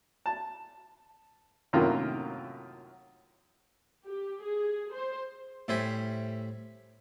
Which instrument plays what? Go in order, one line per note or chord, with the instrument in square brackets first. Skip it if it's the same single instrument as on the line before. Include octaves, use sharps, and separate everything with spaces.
[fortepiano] A5
F#2 A2 C3 D#3 A#3 F4
[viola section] G4
G#4
C5
[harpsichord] A2 G3 C5 E5 G#5